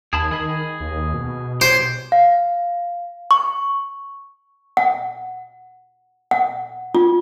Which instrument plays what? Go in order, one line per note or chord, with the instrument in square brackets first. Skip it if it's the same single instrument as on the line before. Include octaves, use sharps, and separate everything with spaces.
[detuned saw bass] D#2 [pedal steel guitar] G#4 A5 B5
[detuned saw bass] D#3 [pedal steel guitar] G#4 D#5 B5
[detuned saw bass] D#2
B2
[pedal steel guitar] G4 G#4 C#5 [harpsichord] C5
[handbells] F5
C#6
[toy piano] F#5
F#5
F4